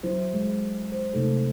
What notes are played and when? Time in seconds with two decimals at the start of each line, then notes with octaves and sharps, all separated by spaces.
0.03 F#3 E4 C5
0.34 G#3
0.92 C5
1.14 C3 A3 D#4 A4